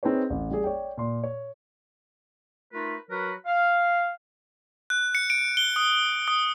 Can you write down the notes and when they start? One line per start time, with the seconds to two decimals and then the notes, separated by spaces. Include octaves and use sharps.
0.03 C4 D#4 G#4 B4 C#5
0.30 A1
0.50 G3 G#4
0.64 C#5 D5 G5
0.97 A#2 C6
1.23 C#5
2.73 A3 D#4 F4 A#4 B4
3.10 F#3 F#4 A#4 B4
3.46 F5
4.90 F#6
5.15 C#7
5.30 D7
5.57 G7
5.76 D#6
6.28 D#6